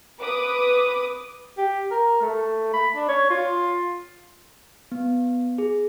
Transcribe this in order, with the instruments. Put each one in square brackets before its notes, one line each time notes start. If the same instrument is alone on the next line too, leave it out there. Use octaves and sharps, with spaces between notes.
[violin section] B4 D6 D#6
[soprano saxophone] G4
A#4
A3
B5
D4
C#5
F4
[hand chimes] B3
G#4